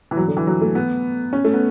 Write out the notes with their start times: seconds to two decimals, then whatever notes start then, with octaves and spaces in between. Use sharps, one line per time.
0.11 E3
0.17 F#3
0.28 D3
0.37 E3
0.47 F#3
0.61 A3
0.75 B3
1.33 C#4
1.45 A3
1.54 B3